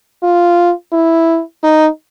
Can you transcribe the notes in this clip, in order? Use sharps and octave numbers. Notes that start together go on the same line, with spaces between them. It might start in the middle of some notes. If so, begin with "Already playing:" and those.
F4
E4
D#4